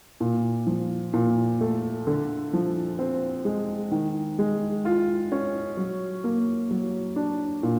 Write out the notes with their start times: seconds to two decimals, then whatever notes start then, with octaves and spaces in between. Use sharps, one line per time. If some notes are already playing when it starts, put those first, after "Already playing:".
0.20 A#2
0.67 F3
1.13 A#2
1.61 A3
2.07 D3
2.53 F3
2.99 C4
3.45 G#3
3.91 D#3
4.39 G#3
4.85 F4
5.32 C#4
5.77 F#3
6.24 A#3
6.71 F#3
7.16 D4
7.63 A#2